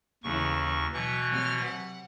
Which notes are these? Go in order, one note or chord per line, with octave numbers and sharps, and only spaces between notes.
D#2 C#3 E3 E4 C#6
B2 E3 F#3 C#6
C3 F#3 F6
F#5